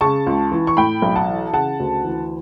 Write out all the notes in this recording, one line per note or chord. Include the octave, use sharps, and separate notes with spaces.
C#3 A5 C#6
C#2
E3
C#6
A2 G5 B5
B1
F#5 A5
E3
C#3 F#5 A5
D2
E3